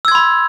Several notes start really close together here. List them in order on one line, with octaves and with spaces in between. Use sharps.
E6 G#6 C6 B5